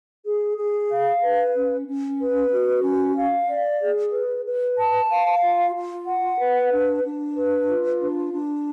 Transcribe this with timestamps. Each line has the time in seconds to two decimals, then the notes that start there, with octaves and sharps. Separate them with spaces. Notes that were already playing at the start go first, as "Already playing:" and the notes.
0.24 G#4
0.57 G#4
0.89 F5
1.22 B4
1.54 C#4
1.86 C#4
2.19 B4
2.51 F#4
2.83 C#4
3.16 F5
3.48 D5
3.81 G#4
4.12 B4
4.45 B4
4.77 A5
5.10 F5
5.41 F4
5.74 F4
6.06 F#5
6.38 B4
6.71 D4
7.03 D4
7.36 B4
7.68 F4
8.00 D4
8.32 D4